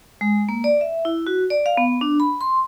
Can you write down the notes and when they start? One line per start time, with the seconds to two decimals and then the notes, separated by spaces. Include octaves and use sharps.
0.21 G#3
0.49 A#3
0.64 D5
0.81 E5
1.05 E4
1.27 F#4
1.50 D5
1.66 F5
1.77 B3
2.01 D4
2.20 B5
2.41 C6